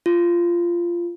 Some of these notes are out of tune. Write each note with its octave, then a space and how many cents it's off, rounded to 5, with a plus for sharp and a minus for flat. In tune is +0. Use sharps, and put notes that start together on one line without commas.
F4 -15